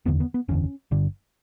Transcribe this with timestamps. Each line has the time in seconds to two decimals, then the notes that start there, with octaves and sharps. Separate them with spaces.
0.05 F#1 E2 D3 B3
0.20 B3
0.34 B3
0.48 F#1 E2 D3 C#4
0.91 G1 G2 D3